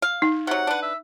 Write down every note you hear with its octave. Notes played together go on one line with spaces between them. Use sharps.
F5
D#4
C3 F#3 F#5
D4 B4
E5